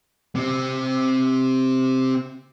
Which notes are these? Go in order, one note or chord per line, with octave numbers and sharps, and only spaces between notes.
C3 C4